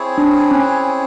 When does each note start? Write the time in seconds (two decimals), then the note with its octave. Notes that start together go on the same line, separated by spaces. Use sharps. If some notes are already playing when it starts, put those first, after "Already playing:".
Already playing: C4 E4 G#4 C#5
0.18 D4
0.51 C#4